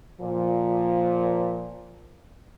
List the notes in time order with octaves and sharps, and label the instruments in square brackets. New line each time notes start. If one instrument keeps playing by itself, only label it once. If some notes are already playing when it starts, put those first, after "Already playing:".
[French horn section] A#2 F3